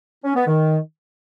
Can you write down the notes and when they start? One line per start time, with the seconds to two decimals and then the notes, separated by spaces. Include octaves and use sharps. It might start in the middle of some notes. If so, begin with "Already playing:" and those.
0.24 C#4
0.35 B3
0.47 D#3